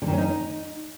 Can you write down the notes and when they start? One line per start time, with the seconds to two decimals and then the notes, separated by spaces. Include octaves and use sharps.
0.02 D3
0.07 D#3
0.13 C#4
0.18 D#4